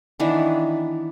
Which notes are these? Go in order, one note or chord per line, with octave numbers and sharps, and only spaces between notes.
D#3 E3 B3 D4